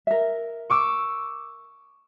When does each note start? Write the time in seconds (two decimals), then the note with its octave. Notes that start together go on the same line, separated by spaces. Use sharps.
0.07 A#4 E5
0.70 C#6 D6 E6